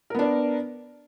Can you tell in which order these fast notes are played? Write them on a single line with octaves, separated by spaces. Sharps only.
A#4 B3 D4